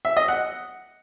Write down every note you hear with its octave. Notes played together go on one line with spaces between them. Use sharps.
E5
D#5
F#5